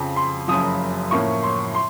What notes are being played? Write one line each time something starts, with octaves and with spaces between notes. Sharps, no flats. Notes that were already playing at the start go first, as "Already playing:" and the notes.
Already playing: F2 C#3 F3 C4
C6
F#1 F#2 C#3 F3 D#6
A2 F3 A#3 C#4 C#6
C6
C6